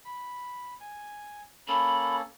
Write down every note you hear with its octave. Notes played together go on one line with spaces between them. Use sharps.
B5
G#5
A#3 C#4 A4 B5